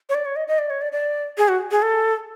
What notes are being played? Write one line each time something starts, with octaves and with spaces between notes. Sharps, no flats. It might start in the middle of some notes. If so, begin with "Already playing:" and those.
C#5
D5
C#5
D#5
D#5
D5
C#5
D5
D5
G#4
F#4
G#4
A4